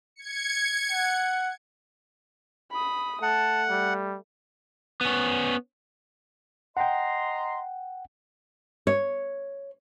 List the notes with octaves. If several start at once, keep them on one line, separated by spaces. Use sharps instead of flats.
G#6 C#7
F#5
B5 D#6
A3 F#5 A5
G3
B3 C#4
D#5 F#5 G5 A#5 C6
C#5